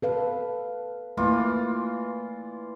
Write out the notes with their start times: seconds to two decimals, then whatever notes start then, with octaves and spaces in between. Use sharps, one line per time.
0.02 A4 B4 F5
1.17 E3 A3 A#3 F4 D5